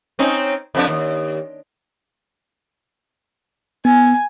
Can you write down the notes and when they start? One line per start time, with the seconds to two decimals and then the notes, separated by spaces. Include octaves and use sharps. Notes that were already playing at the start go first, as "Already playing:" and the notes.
0.19 C4 C#4 D#4
0.75 F2 F3 D4
0.88 D#2
3.85 B3 G#5